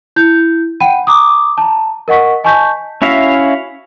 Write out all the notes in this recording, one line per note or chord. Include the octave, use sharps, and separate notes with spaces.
E4 G6
F#5 G5 B5 D#7
A#5 D6 D#6
A5 A#5
A#4 D#5 F#5 C#6 B6
D#5 G#5 A5 C#6 G6 B6
C#4 E4 F#4 E5 F5